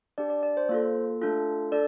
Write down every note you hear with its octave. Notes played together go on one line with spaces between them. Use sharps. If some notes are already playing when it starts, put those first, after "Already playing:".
D4 G4 D5
D5
D5
C5
A#3 F4 A4 C5
A3 D4 F4 A4
D4 A4 D5